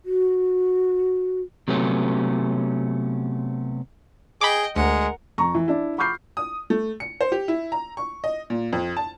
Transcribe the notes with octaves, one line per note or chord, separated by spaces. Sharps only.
F#4
C3 F#3 A3 B3 C#4
G#4 D#5 G5 B5 D6
D2 G#3 A#4 F#5
F2 A#5 C#6
E3
D4 E4
B5 C#6 D6 F6 G6 C7
D#6
A3
C#7
C5
G4
E4
A#5
C#6
D#5
A#2
F2
A5